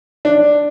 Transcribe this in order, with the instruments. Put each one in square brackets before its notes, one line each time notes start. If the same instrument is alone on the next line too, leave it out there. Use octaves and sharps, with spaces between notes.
[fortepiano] D4